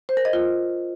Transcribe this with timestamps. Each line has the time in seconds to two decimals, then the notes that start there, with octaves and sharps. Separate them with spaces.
0.09 C5
0.17 A#4
0.25 D#5
0.33 F4